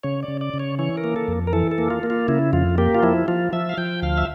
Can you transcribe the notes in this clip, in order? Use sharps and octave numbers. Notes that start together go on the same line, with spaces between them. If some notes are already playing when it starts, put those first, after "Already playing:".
C#3 C#5
D5
C#3
D5
C#3
C#5
E3 C#5
A#4
A#3
A4
F2
A#4
E3 A4
A4
A#3
F4
A#3
F4
C#3 E4
F2 F4
A#3 G4
F4
F3 E4
F3 F4
F3 E5
F5
F3 G5
D2 F5
E5